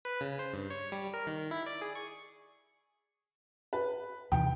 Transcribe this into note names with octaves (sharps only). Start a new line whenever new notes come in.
B4
C#3
C5
G2
C#5
G3
A#4
D#3
E4
D5
G#4
C#6
B4
D#2 C3 E3 G5